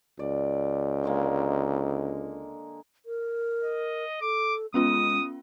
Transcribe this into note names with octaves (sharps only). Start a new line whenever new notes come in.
C#2 D5
D3 G#3 A#3
A#4
D#5
A4 D6
G#3 B3 C#4 F4 D#6